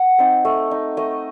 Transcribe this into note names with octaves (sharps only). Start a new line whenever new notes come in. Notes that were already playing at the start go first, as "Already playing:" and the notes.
Already playing: F#5
C4 D#4
A3
D#4
A3 D#5